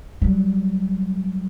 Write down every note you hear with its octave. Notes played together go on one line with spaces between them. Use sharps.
F#3 G3